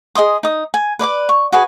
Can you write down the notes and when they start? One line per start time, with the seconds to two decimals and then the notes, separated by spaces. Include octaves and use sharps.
0.15 G#4 D#5 C6 D#6
0.43 D#4 D#6
0.74 G#5
0.99 B4 D5 A#5 D6
1.29 C#6
1.52 F#4 G#4 B4 G#5